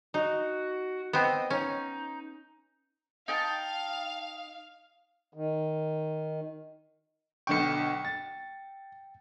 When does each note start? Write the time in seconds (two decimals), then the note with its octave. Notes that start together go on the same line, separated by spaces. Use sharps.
0.14 D#4 F#4
1.13 B3 C4 D#5
1.50 C#4 D#4
3.28 D#4 F5 G5 A5
5.34 D#3
7.47 B1 D3 G5 C#6 C#7
8.05 A6